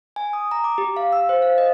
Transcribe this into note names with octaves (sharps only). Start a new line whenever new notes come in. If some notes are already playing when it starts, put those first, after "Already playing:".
G#5
D#6
A#5
D6
G4
F5
E6
C5
F5
D#5